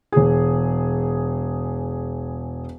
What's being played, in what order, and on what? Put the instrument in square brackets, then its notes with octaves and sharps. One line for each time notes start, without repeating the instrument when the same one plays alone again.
[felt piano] E1 G#4